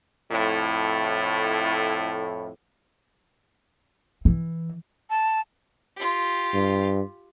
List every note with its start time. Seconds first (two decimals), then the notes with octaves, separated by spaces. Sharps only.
0.31 F2 A2
4.25 E3
5.10 A5
5.97 F4 G4
6.54 G2